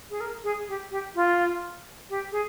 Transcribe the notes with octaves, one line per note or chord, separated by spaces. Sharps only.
G#4
A#4
G#4
G4
G4
F4
G4
G#4